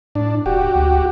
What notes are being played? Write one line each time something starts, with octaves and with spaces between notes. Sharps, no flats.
A2 D4
E1 F#4 G4
D2